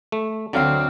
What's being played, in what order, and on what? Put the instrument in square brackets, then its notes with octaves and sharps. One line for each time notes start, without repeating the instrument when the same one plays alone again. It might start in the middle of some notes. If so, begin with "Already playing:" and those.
[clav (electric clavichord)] A3
[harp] D2 F5 D6 [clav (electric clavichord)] D3 F#3 [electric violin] C4